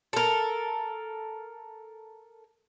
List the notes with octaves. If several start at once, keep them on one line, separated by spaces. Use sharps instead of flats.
A4 A#4